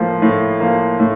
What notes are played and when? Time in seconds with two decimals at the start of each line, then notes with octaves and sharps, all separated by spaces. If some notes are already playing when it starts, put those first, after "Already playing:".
Already playing: A2 F3 A#3
0.22 A2
0.60 F3 A#3
1.00 A2